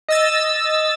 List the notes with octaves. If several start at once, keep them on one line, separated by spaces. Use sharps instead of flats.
D#5 E6 A6